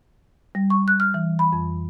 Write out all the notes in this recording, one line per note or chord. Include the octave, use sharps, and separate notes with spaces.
G3
C#6
F#6
F6
E3
B5
F2